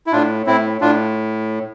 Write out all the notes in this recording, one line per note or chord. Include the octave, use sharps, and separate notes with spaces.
E4
A2 D4 F4
A2 C4 E4
A2 D4 F4